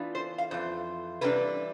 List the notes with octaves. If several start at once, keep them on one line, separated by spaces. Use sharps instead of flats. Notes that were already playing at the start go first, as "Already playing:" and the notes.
Already playing: E3 B3 D4 F4
C5
F5
F2 E3 F4 C5
C3 E3 G3 D4 B4